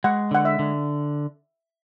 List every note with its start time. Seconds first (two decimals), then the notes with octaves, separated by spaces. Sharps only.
0.04 G#3 F#5
0.31 D3 F#5
0.45 E5
0.59 D3